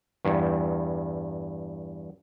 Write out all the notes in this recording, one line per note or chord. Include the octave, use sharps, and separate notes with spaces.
E2 G2